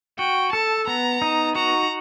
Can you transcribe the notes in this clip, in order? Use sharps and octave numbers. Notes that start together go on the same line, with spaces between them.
F#4 G5
A4 A5
B3 A#5
D#4
F#4 A#5